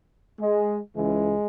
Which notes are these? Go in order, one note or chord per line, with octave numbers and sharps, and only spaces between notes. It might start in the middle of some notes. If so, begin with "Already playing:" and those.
G#3
C#2 C#3 E3 G#3